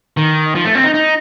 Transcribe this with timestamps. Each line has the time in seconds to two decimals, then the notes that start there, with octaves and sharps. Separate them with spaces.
0.17 D#3
0.55 F3
0.65 A3
0.75 C4
0.84 D#4
0.94 D#4